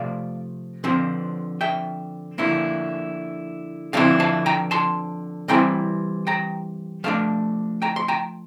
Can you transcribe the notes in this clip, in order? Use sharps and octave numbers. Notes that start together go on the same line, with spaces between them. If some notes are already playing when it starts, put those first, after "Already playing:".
Already playing: C3 F3 A3 D5 F5
D3 F3 C4
E5 G5
D3 F3 A#3 E4
D3 F3 C4 E4 F5 A5
F5 A5
G5 A#5
A5 C6
E3 G3 C4 E4 G5 A#5
G5 A#5
F3 A3 D4 F5 A5
G5 A#5
C6
G5 A#5